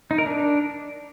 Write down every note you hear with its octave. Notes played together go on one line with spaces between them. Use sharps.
D#4
A#4
D4